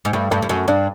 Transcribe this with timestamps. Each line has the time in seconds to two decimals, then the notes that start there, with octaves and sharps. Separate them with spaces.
0.05 G#2
0.13 G2 A3
0.31 G2 A3
0.42 G2
0.49 F#2 A3
0.68 G2 D4